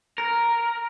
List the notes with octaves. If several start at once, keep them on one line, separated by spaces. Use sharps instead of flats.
A#4